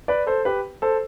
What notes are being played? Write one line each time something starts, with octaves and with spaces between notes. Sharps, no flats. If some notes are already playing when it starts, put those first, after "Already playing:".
B4 D5
A4 C5
G4 B4
A4 C5